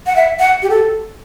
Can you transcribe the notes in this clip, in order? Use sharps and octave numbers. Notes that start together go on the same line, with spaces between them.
F#5
E5
F#5
G4
A4